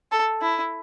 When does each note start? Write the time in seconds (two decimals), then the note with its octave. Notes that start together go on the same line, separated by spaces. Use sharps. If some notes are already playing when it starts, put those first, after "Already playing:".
0.12 A4
0.42 E4